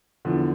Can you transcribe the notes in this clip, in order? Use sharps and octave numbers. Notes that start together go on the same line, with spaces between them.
E2 D3 F3